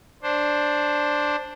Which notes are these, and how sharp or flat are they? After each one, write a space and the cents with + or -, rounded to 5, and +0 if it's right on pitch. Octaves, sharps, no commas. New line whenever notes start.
D4 +0 C5 +5